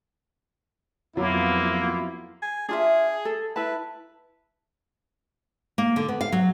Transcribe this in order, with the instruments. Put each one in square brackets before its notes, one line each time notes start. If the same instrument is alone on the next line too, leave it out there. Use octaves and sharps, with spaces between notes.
[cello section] F2 B3 F4 [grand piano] F#3 [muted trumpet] A#3 [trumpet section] E4
[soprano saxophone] G#5
[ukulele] D4 F4 E5 [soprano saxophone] G#4
[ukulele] A4
[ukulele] E4 A5 [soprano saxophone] B4
[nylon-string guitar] A#3
D3
B3
F5
F#3